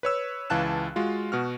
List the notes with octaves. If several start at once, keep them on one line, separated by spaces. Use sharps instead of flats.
B4 C#5 E6
C#2 E3 F5 A5 F#6 E7
G#3 F4 F#4
B2 F#4 F6